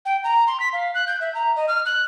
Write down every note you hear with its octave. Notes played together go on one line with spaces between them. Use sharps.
G5
A#5
C6
B6
F5
F#6
G6
E5
A#5
D#5
F6
F#6